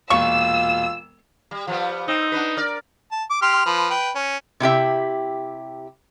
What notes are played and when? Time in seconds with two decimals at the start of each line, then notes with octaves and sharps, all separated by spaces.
0.10 E1 A#2 F4 C#6 E6
1.51 G3
1.67 F3 G3 B3
2.08 C4 D#4
2.32 B3 D4 B4
2.57 A#4 D5
3.12 A5
3.30 D6
3.42 G4 C6 F6
3.66 F3 B4
3.90 B4 G5
4.16 C#4
4.60 C3 E4 G4 E5